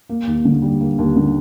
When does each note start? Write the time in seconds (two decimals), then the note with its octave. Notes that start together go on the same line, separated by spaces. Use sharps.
0.09 A#3
0.27 D#2
0.45 D3
0.62 G3
0.80 A#3
0.98 D#2
1.16 D3